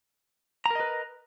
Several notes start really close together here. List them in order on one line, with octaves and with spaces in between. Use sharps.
A#5 A#4 D#5 B4